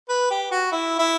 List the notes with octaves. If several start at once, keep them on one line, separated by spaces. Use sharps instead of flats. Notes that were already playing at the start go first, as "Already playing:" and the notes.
B4
G4
F#4
E4
E4